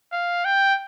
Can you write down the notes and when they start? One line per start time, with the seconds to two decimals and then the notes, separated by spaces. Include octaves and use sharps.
0.12 F5
0.45 G5